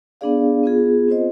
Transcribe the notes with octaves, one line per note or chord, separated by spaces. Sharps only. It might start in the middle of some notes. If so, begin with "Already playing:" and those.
B3 D4 G#4 D5 F5
B3 F4 G#4
C4 F4 C5 D#5